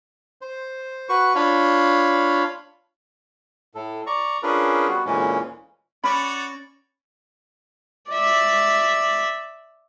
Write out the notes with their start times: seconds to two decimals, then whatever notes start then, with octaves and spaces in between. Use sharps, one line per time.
0.41 C5
1.09 F#4 B4 C#6
1.35 D4 F4 C#5 F5 B5
3.75 A2 A4
4.07 D5 A#5 C#6
4.43 C#4 D4 F4 G#4 A#4 B4
4.88 G3 B3 F#4
5.06 D2 A#2 E3 G#3 A#3 C#4
6.04 C#4 F#4 C#5 D5 B5
8.10 D5 E5